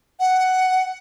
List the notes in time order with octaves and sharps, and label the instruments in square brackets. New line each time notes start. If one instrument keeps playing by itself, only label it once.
[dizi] F#5